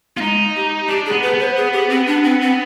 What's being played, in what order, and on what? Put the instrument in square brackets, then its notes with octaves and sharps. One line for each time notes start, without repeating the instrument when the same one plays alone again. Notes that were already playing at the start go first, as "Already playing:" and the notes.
[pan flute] B3 [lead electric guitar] F4
[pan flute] G#3 [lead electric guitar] D#4
[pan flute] G4
[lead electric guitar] D4 [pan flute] G4
[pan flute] G#4
[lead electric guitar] B3
[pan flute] B4
[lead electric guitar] B3
[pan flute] C5
G#4
G4
C4
D4
C4
C4